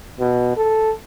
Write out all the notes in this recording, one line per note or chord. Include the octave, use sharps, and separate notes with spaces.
B2
A4